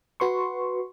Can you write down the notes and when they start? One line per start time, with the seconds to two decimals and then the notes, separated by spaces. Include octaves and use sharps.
0.20 F#4 B4 C6 C#6